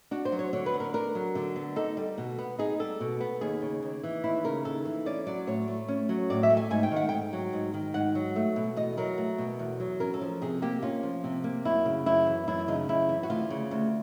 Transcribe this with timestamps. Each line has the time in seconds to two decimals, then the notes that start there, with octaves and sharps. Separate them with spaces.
0.11 D4 F#4
0.25 C5
0.32 F#3
0.39 C#5
0.53 D3 C#5
0.66 B4
0.74 B3
0.80 A#4
0.94 D4 A#4
1.15 F#3
1.35 D3
1.56 B3
1.76 D#4 A4
1.97 G3
2.18 B2
2.39 B3
2.59 D#4 G#4
2.79 G3 A4
3.00 B2
3.20 B3
3.41 D#2 G#4
3.62 C#3
3.83 D#2
4.03 E3
4.24 D#2 E4
4.44 C#3 A#4
4.65 D#2 A4
4.85 E3
5.06 C#4 D5
5.27 F#3 D5
5.47 A2 C#5
5.68 A3
5.88 C#4
6.09 F#3
6.30 A2 D5
6.43 E5
6.50 A3
6.57 G#5
6.70 G#2 G#5
6.83 G5
6.91 D#3
6.96 F#5
7.09 G#2 G5
7.33 F#3
7.53 G#2
7.74 D#3
7.94 G#2 F#5
8.15 F#3
8.36 A3
8.56 B2
8.77 E2 D#5
8.97 F#3 A#4
9.18 A3
9.38 B2
9.59 E2
9.80 F#3
10.00 C#4 A#4
10.14 A4
10.21 F3
10.42 C3 G#4
10.62 A#3 G4
10.82 C#4 F4
11.03 F3
11.24 C3
11.44 A#3
11.65 F#2 E4
11.86 C#3
12.06 F#2 E4
12.27 E3
12.48 F#2 E4
12.68 C#3 D#4
12.89 F#2 E4
13.09 E3
13.23 F#4
13.30 D2 F4
13.50 C#3
13.71 D2